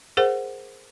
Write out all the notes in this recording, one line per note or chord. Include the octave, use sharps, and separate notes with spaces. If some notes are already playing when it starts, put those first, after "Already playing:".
G#4 A#4 C5 F#5